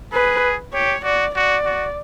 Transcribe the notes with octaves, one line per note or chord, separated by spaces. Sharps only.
G#4 B4
G4 C#5
F#4 D5
F#4 D5
F#4